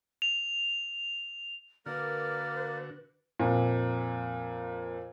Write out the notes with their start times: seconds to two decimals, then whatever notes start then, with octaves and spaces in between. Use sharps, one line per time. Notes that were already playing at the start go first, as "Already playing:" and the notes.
0.22 F7
1.86 D3 A#3 F#4 A#4 B4 D5
3.39 F2 A#2